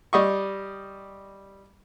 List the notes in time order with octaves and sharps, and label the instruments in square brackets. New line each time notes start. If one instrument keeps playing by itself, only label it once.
[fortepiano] G3 D#5 C#6